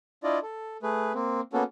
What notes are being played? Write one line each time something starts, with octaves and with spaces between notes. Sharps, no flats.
D4 E4 F4 D5 D#5
A4
A3 G#4 B4
A#3 C4
A#3 B3 C#4 F#4 A4